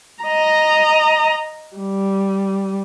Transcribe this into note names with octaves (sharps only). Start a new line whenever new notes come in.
D#5 A#5
G3